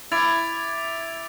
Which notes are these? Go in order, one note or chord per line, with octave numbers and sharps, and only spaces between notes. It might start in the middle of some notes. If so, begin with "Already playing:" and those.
E4 D6 A6 D7 F7